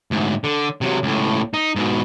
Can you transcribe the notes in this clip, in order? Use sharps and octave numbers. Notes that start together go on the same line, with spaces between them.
D2 G#2
D3
C3 F#3
C#2 A2
D#4
G#2 B2